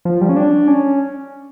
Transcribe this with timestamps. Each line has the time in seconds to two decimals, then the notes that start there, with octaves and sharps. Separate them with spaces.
0.05 F3
0.21 G3
0.29 C#4
0.36 D4
0.68 C#4